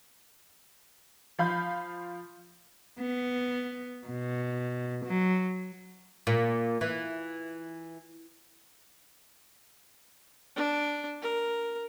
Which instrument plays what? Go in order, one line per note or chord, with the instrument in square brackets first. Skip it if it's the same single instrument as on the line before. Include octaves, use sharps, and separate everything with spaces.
[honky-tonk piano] F3 F5 B5 G6
[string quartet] B3
B2
F#3
[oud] A#2
E3
[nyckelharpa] D4
A#4